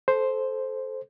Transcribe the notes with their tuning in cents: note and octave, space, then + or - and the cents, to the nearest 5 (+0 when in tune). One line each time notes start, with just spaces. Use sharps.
A4 -15 C5 +0